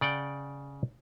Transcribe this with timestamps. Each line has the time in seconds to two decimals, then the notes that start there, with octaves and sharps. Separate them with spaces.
0.01 C#3 D5 F#5 G5